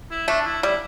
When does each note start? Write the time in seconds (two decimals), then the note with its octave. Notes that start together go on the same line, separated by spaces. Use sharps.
0.11 E4
0.28 A3 D4
0.46 E4
0.63 G3 E4